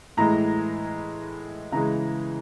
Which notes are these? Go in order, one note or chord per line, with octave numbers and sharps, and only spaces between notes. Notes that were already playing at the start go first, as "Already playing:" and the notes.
A2 E3 G#3 A#5
C#3 E3 G#3 A#5